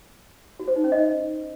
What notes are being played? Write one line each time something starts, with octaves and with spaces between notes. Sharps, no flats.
F#4
C5
D#4
C#4
D#5